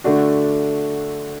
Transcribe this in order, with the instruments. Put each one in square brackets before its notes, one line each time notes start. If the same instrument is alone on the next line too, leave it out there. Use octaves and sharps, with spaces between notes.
[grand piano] D3 A3 D4 F#4